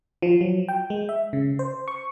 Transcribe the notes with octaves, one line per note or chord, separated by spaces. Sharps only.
F3
F#3
G5
G#3
E5
C#3
C5
C#6